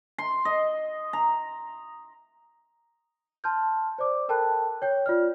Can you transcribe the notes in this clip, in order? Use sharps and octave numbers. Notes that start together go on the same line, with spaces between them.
C6
D#5
A#5
A5 C6 F6 G6
C5 D5 D6
A4 A#4 G5 A5 B5 F#6
C#5 G5 G6
F4 D5 F6